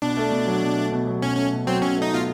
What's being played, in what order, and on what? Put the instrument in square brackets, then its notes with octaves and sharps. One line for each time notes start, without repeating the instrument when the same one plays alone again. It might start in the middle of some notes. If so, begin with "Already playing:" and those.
[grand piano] B2 [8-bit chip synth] D4
[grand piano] A3
B2
F#3
B2
A3
B2
F#3
[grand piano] B2 [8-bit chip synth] C#4
[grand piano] A3 [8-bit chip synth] C#4
[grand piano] B2
[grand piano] F#3 [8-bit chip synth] C4
[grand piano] B2 [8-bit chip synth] C#4
[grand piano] A3 [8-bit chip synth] D#4
[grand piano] B2 [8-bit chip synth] F4